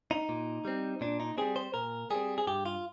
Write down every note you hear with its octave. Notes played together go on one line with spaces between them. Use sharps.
D#4
A#2
G3 C4
A#2 D4
D#4
G3 C4 G#4
C5
A#2 A#4
G3 C4 G#4
G#4
G2 G4
F4